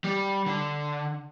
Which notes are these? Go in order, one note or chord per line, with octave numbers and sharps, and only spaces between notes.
G3
D3